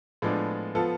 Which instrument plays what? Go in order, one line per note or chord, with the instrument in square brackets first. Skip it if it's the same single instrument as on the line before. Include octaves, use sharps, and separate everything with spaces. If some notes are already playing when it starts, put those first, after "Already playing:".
[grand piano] A2 F3 G#3 B3 D4
F3 B3 F4 A4